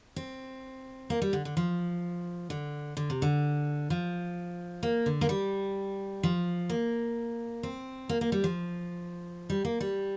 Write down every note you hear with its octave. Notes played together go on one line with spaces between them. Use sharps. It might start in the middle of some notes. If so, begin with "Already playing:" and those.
C4
A#3
G3
D3
D3
F3
D3
D3
C3
D3
F3
A#3
D3
A#3
G3
F3
A#3
C4
A#3
A#3
G3
F3
G3
A#3
G3